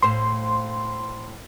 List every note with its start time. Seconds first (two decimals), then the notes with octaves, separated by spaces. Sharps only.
0.02 A2 C5 F5 C6